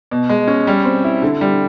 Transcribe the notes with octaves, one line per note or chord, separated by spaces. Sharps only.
B2
G#3
C#4
G3
C4
E4
D3
G3